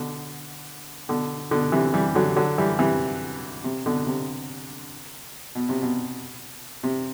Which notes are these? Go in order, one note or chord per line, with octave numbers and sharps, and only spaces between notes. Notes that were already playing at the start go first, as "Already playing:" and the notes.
Already playing: B2 D3
B2 D3
B2 D3
C3 E3
E3 G3
D3 F#3
D3 F#3
E3 G3
C3 E3
C3
B2 D3
C3
B2
C3
B2
C3